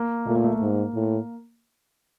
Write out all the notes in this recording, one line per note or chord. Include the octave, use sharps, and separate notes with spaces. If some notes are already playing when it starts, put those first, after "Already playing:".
Already playing: A#3
A#2 A3
A#3
A3
A#3
G#2
A2